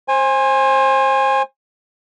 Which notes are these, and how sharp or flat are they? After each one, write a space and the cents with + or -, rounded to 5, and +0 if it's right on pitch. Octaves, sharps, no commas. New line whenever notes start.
C5 +25 G#5 -20